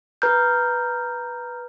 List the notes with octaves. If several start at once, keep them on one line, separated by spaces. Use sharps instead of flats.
B4 A#5 F6 G6